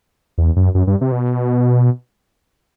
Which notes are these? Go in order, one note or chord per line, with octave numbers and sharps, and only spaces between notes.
E2
F#2
F#2
G2
C3
B2